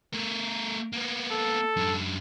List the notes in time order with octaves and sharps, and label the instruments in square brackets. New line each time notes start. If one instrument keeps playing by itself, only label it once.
[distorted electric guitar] A3 A#4
A#3 B3
[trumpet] A4
[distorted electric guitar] F#2 D4